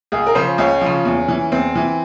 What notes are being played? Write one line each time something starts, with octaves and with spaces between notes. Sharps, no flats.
C#2 G#4
A#4
C#3 F3 C5
C#2 C#4
C#3 F3
E2
E3
E2 C4
E3